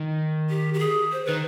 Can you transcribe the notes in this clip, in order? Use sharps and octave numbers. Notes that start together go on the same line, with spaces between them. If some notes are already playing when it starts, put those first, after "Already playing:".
Already playing: D#3
G4
G4
G#4
C5
D#3 B4